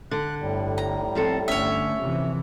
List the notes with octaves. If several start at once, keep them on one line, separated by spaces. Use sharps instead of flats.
D3 F#6
G1 A2 G3
A#5
F3 C4 A4
G1 D3 A3 C#4 C#5 E5
F2 C3 E3